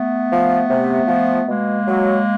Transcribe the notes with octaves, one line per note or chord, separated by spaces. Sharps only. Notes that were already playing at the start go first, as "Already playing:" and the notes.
Already playing: A3 B3
F3
C3
F3
B2 G#3 A#3
F#3